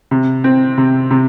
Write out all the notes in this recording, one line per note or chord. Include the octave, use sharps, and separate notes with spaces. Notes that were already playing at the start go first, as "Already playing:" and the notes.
C3
C4
C3
C3